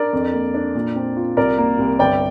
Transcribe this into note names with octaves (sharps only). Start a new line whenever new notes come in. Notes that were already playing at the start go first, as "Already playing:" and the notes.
Already playing: D4 A#4 D5
F2
A#3
D4
A#2
C4
F4
C2 A#4 D5
A#3
C2
G1 D5 G5